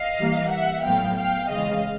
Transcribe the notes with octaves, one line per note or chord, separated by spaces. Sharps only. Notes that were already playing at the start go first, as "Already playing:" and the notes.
Already playing: D#5 F5
E3 G3 A#3
E5 F#5
A2 F#3 B3 F5 G5
F5 G5
C#3 E3 G#3 D#5 F5